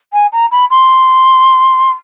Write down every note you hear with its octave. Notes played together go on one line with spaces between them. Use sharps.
G#5
A#5
B5
C6